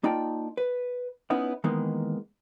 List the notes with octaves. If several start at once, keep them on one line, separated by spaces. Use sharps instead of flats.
A#3 D#4 F4 D5 G5 A5
B4
B3 C#4 D#4 E4
D#3 E3 G#3 A#3 B3 D#4